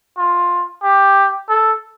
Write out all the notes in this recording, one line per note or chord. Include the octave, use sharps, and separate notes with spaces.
F4
G4
A4